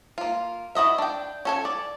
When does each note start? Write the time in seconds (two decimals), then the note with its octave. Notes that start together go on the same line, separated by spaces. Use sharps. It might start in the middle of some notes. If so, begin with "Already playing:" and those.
0.18 A#3 F4
0.75 E4 F#4 D#5 E5
0.98 D4 G5
1.45 C#4 A4 G#5
1.65 D5